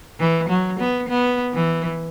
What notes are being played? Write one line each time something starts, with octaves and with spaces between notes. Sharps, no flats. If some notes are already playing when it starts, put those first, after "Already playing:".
E3
F#3
B3
B3
E3